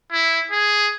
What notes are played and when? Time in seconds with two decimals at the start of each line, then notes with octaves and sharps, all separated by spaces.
0.12 E4
0.51 G#4